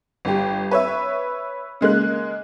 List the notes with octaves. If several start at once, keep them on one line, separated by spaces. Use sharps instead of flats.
G1 G4
B4 C#5 E5
C#3 G#3 A#3 F#6